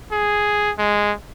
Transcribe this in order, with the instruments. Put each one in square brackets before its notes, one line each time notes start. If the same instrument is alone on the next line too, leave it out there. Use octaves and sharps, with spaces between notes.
[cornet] G#4
G#3